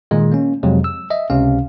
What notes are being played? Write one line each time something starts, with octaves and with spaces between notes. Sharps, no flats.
A#2 D#3 G#3
A#3 C#4
F2 C3 F#3 G#3
E6
D#5 E5
C#2 C3 C#4 F5